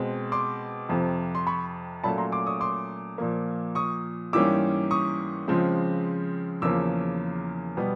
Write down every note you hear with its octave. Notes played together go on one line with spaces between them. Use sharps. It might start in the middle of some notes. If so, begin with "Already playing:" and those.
Already playing: B2 G#3 C4
C6 D6
F2 C3 F3
C6
B5 C#6
A#2 F#3 A3 C#4 A5 B5
A#5 C6
C6 D6
C#6 D#6
C6 D6
A#2 F3 A#3
C#6 D#6
G#2 E3 G3 A#3 C#4 D6 E6
C#6 D#6
C#3 F3 G#3 C4
E2 C#3 F3 A#3 C#4 D6 E6
B2 G3 B3